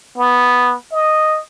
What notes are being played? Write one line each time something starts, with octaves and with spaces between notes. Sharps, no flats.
B3
D#5